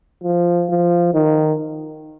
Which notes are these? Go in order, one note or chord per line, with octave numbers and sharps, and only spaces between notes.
F3
F3
D#3